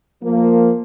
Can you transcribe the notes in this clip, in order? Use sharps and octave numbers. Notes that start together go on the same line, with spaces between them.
F3 A#3